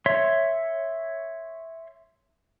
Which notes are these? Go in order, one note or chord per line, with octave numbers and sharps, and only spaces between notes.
C#5 E5 C6